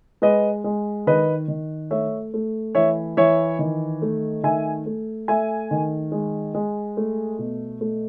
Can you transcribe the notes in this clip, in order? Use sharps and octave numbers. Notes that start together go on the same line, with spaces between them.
G#3 B4 D#5
G#3
D#3 B4 D#5
D#3
A3 C#5 E5
A3
E3 C#5 E5
E3 C#5 E5
D#3
A3
D#3 E5 G#5
A3
A3 E5 G#5
D#3
G#3
G#3
A3
B2
A3